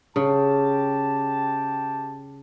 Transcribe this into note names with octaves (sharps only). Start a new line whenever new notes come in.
C#3 G4 G5 A5